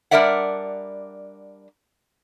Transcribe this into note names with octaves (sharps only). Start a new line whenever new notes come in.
G3 D4 A#4 D5 E5 F#5